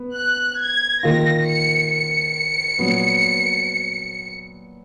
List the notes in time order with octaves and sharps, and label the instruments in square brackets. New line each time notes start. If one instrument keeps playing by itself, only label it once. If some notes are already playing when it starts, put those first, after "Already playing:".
Already playing: [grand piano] B3
[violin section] F#6
G#6
[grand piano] D#3 A#3 F4 [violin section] A#6
[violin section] C#7
C#7
[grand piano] A#2 F#3 B3 F#4